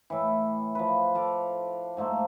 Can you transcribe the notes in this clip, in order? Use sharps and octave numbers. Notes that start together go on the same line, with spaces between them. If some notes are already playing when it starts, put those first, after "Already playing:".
A2 E3
F3 B4
A4 F5 D6
G#2 A3 A#3 C5